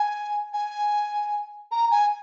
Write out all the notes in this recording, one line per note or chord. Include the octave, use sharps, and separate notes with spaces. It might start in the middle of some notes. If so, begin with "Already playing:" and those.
Already playing: G#5
G#5
A#5
G#5